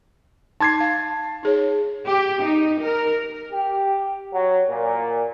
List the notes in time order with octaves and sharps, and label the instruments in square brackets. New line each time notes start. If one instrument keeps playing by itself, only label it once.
[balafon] D#4 C6 D6 [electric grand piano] A5 G#6 C7
[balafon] F5
D#4 G#4 C#5
[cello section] G4
D#4
A#4
[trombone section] G4
F#3
A#2